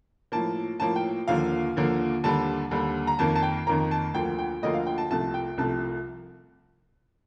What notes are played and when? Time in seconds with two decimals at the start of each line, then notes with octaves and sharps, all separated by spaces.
0.32 A2 F3 A#3 A5
0.80 A2 F3 A#3 A5
0.96 G5
1.28 D#2 D3 F3 A#3 F5
1.76 D#2 D3 F3 A#3
2.24 D#2 D3 G3 A5
2.71 D#2 D3 G3
3.07 A#5
3.19 F2 D#3 A#3 A5
3.35 A5
3.43 G5
3.67 F2 D#3 A#3 A#5
3.91 A5
4.14 D2 D3 F3 A#3 G5
4.39 G5
4.62 D2 D3 F3 A#3 D#5
4.74 F5
4.87 G5
4.98 A5
5.10 C2 C3 F3 A3 A5
5.34 G5
5.58 C2 C3 F3 A3 A5